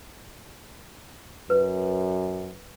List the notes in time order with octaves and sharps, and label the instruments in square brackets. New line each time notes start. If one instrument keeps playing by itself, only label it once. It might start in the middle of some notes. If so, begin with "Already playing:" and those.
[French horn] F#2 [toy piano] B4